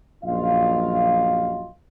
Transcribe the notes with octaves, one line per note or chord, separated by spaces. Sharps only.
A#1 F#2 F#3 F4 D#5 F5